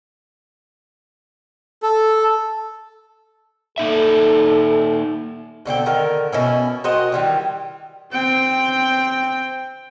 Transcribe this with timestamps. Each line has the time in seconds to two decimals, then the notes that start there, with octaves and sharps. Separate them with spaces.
1.82 A4
3.78 A#3 D#4 A4 E5
5.65 B2 D3 C4 G5
5.86 D3 D#3 A#4
6.32 B2 C#4 E4
6.84 C4 F#4 A#4 D#5
7.12 D#3 E3 G3
8.12 C4 G5